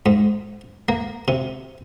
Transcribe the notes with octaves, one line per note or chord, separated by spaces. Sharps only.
G#2
A#3
C3